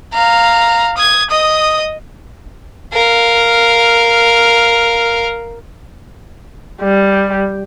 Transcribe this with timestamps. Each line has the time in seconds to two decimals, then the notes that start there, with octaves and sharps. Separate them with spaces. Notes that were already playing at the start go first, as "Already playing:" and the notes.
0.14 F5 A#5
0.98 D#6 G#6
1.30 D#5 D#6
2.93 A#4 F5
6.81 G3